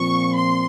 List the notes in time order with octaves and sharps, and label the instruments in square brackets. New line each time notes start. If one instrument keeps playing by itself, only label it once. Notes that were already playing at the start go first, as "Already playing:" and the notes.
Already playing: [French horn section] A#2 F3 C4 [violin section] C#6
[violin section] C6